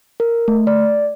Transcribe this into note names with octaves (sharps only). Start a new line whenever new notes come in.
A#4
A3
D5